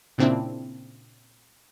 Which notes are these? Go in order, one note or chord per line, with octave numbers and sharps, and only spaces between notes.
A#2 C#3 C4 D4 E4